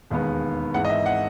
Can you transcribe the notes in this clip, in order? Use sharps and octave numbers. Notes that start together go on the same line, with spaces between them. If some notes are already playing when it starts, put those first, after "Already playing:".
E1 D#2 D#3 G#3 B3
G#1 G#2 E3 F#5
D#5
E5
F#5